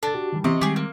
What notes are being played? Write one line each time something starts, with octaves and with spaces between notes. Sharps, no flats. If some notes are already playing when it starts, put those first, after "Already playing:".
D4 A4 A6
F#4 G4
D#3 E3 G3
C3 E3 D#5 C#6
D#3 G3 G#3 G4 G#4
A#3